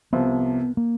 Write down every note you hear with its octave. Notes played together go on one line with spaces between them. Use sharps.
C2 C3 F3 B3
A#3